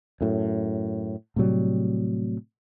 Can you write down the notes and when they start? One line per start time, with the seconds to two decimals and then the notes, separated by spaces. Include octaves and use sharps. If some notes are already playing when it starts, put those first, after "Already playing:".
0.21 F#2 A2
1.36 A2 C3 F#3 G3